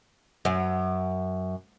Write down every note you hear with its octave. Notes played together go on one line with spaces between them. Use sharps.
F#2